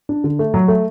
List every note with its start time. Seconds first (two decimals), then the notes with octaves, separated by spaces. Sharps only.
0.09 D4
0.24 D3
0.39 A3
0.54 F#3
0.68 A3